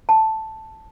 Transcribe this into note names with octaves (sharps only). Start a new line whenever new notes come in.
A5